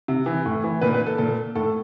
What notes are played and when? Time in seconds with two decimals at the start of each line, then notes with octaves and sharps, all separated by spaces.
0.08 C3
0.26 E3
0.45 A2
0.64 E3
0.81 A#2 B4
0.94 B4
1.07 A4
1.18 A#2 A4
1.55 A2 A4